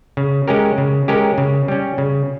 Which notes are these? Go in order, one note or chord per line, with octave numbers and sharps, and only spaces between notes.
C#3
G#3 C#4 G4 A#4
C#3
G#3 C#4 G4 A#4
C#3
G3 C#4
C#3